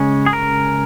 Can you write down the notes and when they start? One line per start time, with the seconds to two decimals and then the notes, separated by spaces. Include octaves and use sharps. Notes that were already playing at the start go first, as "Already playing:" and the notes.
Already playing: C#3 G#3 C#4
0.26 G#4
0.33 A#4